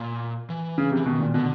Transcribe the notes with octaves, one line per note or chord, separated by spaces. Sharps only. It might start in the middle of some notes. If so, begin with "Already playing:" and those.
Already playing: A#2
E3
C#3
C3
E3
B2 D#3
A#2
B2 D3